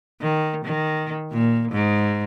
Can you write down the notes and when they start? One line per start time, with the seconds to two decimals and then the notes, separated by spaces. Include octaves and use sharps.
0.21 D#3
0.65 D#3
1.31 A#2
1.71 G#2